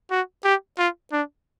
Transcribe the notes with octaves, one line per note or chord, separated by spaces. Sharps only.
F#4
G4
F4
D4